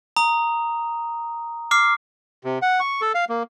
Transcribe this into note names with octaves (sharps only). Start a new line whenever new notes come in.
A#5 D#6
D6 F6 C7
C3
F#5
C#6
A4
F5
A#3